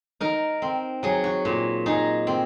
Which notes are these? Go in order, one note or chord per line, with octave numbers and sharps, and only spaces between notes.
D#4 A#4
C4
F#3 G#4
F#4
A#2
D#4 G#4
C4